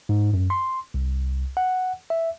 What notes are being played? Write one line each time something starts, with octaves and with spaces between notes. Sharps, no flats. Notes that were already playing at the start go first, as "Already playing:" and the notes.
G#2
F#2
C6
C2
F#5
E5